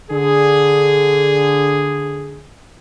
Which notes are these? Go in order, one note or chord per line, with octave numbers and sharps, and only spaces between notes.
D3 G#4